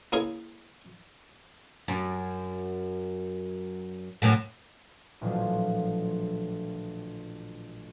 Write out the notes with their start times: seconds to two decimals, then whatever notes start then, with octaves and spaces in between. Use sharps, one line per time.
0.12 A#3 C#4 E4 G#4
1.88 F#2
4.22 F#2 A2 D3
5.21 A1 A#2 D3 F3 F#3